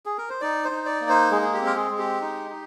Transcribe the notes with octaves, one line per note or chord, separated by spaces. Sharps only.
G#4
A#4
C5
D#4 D5
C5
D#4
D5
A#3
C5
G#3 G#4
G#4
G4
C4
A#4
G#4
G#3
G4
D#4
D#4